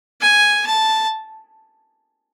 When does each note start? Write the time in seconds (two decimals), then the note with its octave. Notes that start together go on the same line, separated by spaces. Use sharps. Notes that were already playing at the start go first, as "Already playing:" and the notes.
0.21 G#5
0.66 A5